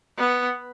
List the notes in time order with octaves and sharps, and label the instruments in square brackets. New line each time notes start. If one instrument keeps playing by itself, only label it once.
[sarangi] B3